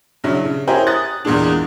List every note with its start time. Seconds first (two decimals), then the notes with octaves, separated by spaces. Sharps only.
0.24 G2 C#3 F#3 E4
0.45 C#3
0.67 C#4 E4 G4 G#4 A#4 C5
0.87 D#6 F#6 A6
1.25 E2 A#2 G#3 D4